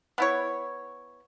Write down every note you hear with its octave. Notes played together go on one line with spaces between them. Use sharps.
B3 E4 C#5